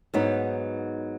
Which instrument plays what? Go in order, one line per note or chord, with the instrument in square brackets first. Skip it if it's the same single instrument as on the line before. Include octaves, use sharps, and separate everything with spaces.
[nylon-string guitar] G#2 F#3 B3 D#4